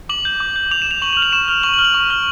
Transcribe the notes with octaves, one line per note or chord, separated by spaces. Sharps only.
D6 F#7
G6
D6
G6
D6 F7
E7
G6 F7
C#6 F#7
F#7
F6
F7
C#6 E7
F6
C#6 F#7
F#7
F6
F#7
C#6
F6